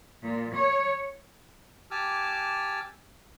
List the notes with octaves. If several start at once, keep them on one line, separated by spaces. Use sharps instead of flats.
A#2
C#5
G4 G#5 A5 D6 E6 F6